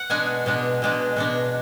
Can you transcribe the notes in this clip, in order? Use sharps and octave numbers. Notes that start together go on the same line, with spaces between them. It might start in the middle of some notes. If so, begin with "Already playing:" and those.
Already playing: F#5
B2 G#3 D4 G#5
B2 G#3 D4
B2 G#3 D4
B2 G#3 D4